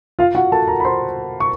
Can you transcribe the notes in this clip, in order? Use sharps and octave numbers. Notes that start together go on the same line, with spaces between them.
F4 F5
F#4 F#5
A4 A5
A#4 A#5
B5
C5 C6
C#6